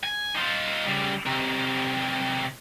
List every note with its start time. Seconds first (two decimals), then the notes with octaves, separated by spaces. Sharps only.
0.04 G#5
0.35 D#4 F4
0.86 C#3 G3
1.26 C3 D#3